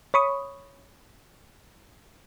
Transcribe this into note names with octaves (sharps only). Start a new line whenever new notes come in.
C#5 B5 C#6 D#6